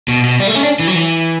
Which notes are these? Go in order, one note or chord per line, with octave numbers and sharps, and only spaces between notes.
B2
B2
G3
A3
C#4
D4
E3
F#3
E3